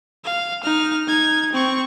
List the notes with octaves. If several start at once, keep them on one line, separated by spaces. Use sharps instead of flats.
F5
D#4 F6
D#4 G#6
C4 C#6